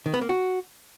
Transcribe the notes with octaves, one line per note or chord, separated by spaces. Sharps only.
D#3
B3
A#3
F#4